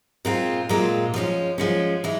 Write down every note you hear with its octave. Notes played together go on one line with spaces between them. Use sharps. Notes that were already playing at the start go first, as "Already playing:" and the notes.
A#2 G#3 C4 F4
A#2 G#3 C4 F4
F3 G#3 C#4
F3 G#3 C#4
E3 G#3